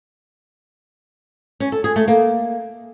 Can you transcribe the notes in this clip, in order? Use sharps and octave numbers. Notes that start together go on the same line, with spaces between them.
C#4
A4
G#4
A3
A#3